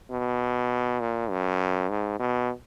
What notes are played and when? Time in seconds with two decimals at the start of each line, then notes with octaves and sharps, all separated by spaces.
0.11 B2
1.00 A#2
1.30 F#2
1.90 G#2
2.19 B2